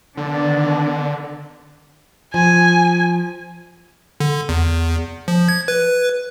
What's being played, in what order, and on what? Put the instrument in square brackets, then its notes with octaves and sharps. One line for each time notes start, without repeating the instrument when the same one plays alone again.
[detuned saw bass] D3 [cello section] D#3 B3 D4
[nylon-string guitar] F3 [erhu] G#5
[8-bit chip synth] D3
E2
F3
G#6
B4